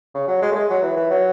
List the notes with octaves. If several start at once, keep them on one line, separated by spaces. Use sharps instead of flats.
C#3
F#3
G#3
A3
G#3
F#3
E3
E3
F#3